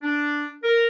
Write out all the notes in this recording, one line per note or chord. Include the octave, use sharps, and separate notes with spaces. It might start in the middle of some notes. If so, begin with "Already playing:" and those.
D4
A#4